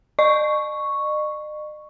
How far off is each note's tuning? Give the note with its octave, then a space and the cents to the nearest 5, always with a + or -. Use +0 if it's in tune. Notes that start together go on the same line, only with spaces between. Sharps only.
D#5 -45 C#6 +0